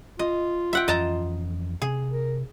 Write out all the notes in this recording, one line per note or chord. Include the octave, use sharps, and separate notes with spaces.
F4 D#5
E5 F#5 G5
F2 E3 C#4 D#5 A5 A#5
C3 G#4
A#4